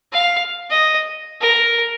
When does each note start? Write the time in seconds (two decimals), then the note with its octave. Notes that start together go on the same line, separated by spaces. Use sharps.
0.13 F5
0.70 D#5
1.41 A#4